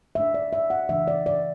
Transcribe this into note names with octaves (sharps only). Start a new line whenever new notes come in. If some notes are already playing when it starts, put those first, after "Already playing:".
D3 A3 D4 E5
D5
E5
F#5
C#3 E3 A3 D4 E5
D5
D5